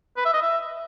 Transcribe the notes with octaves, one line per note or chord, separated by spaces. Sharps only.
B4
E5
D#5
E5